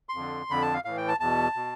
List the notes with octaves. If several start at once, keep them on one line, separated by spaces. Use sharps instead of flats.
C6
F2 D3
F2 D3 B5
A5
F5
A2 E3 F5
G5
A5
E2 B2 A5
B2